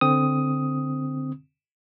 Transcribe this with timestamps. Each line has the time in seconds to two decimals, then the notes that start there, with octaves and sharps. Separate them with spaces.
0.01 D3 C4 D#6